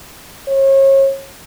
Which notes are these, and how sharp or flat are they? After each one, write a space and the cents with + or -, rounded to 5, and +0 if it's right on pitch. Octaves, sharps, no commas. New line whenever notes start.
C#5 -35